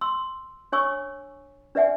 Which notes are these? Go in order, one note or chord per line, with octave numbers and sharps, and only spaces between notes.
C6 E6
D4 C#5 G#5 C#6 D6 E6
D4 B4 D5 E5 F#5 G#5